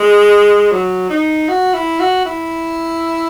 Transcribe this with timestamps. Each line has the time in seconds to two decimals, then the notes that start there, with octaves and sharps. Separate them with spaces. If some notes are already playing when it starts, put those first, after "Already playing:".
Already playing: G#3
0.72 F#3
1.10 D#4
1.49 F#4
1.74 E4
2.00 F#4
2.26 E4